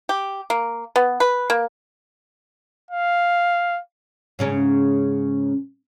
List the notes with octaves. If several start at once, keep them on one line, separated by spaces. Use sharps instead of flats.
G4
A#3
B3
B4
A#3
F5
G#2 C#3 C#4